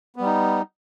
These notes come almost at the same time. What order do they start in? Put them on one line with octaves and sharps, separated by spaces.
B3 G3 D#4